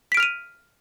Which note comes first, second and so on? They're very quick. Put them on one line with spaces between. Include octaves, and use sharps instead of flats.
B6 D7 F6 F7 D#7